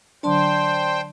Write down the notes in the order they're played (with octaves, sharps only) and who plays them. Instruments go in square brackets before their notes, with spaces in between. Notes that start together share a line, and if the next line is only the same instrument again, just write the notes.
[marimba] D3 F#3 D4 [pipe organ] C5 G5 [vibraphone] D5 A5 C6